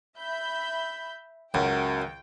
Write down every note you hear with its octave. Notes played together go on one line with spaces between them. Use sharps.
E5 B5 G6
C#2 F#2 G5